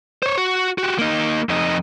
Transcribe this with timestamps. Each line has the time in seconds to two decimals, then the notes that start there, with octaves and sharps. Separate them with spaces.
0.23 C5 C#5
0.37 F#4
0.78 F#4 G4
0.99 A#3 D#4
1.49 F2 D#4